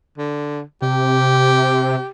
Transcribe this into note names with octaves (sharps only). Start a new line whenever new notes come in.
D3
C3 G4